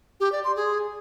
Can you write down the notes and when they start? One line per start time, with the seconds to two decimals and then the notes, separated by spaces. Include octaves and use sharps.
0.20 G4
0.32 D5
0.44 C6
0.56 G#4